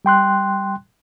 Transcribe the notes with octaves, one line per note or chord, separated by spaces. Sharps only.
G3 G5 C6 F#6